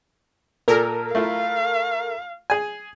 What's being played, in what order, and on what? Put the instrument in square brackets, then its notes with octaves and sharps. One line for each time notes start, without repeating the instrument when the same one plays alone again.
[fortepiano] A#2 [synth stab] A4 A#4
[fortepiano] A3 E4 F4 [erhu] F5
[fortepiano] G#4 G#5